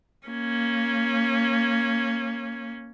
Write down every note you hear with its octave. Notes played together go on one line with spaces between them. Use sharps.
A#3 C#4